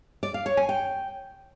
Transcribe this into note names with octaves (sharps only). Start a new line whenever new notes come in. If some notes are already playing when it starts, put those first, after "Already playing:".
D5
F5
C#5
G#5
G5